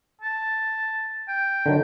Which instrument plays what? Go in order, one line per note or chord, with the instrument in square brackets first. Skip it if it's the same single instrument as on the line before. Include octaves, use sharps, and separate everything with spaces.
[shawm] A5
G5
[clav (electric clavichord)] D3 D#3 F#3